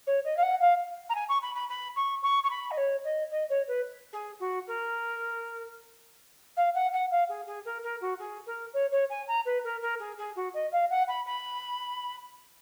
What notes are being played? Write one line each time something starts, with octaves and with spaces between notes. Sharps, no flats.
C#5
D#5
F5
F#5
F5
A#5
G#5
C#6
B5
B5
B5
C#6
C#6
C#6
B5
D#5
C#5
D#5
D#5
C#5
B4
G#4
F#4
A#4
F5
F#5
F#5
F5
G#4
G#4
A#4
A#4
F#4
G#4
A#4
C#5
C#5
G#5
A#5
B4
A#4
A#4
G#4
G#4
F#4
D#5
F5
F#5
B5
B5